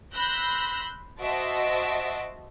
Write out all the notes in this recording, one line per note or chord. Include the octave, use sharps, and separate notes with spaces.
B5 C6 E6 F#6 G6 A#6
F#4 C5 D#5 E5 A5 D7